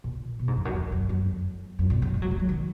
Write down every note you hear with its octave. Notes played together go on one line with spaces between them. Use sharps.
A#2
B2
G#2
F2
F#2
F2
F#2
F#2
F2
F#2
A#2
C#3
G#3
F#3
G#3
F#3
D#3